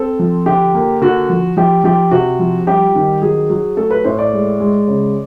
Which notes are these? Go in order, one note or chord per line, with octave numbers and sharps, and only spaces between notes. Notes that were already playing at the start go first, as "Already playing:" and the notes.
Already playing: C4 A4
F3
D3 G4
A#3
D3 F#4
F3
F3 G4
F3 G4
C3 F#4
F3
G3 G4
D#3
F#3 G#4
F#3
A3 A4
B4
A2 C5
D5
G#3
G#3
C#3